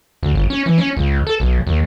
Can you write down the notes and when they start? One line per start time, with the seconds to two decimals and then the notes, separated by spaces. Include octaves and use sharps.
0.23 D2
0.35 G1
0.50 C#4
0.66 E3
0.78 C#4
0.97 C#2
1.27 A4
1.40 B1
1.67 D#2